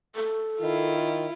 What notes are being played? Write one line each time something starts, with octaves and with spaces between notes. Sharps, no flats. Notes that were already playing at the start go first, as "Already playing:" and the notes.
A4
D#3 E4 F4